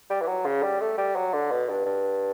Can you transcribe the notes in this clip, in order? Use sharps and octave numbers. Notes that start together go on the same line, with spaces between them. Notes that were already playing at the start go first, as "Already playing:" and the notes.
G3
E3
F#3
C#3
G3
A3
G3
F#3
D3
B2
G2
G2